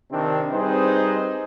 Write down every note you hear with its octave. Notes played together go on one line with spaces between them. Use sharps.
C3 D#3 C4 D4
G3 C4 D#4 G#4 B4 C5